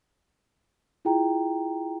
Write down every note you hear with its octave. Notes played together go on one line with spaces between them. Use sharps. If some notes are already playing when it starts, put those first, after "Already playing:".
E4 F4 G#4 G5 A#5